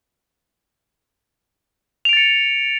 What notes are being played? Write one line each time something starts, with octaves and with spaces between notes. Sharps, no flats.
A6 C#7 D7 F7